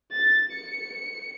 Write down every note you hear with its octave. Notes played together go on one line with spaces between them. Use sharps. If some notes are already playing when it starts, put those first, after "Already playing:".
A6
C#7